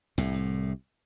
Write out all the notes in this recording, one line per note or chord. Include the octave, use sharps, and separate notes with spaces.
C2 A2